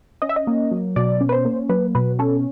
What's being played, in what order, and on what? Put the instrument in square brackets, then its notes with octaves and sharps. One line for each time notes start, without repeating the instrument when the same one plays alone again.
[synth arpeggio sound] C#4 D#5
E5
D#5
A#3
F#3
B2 D5
C#4
B4
C5
A#3
F#3 B4
B2 B4
C#4 A4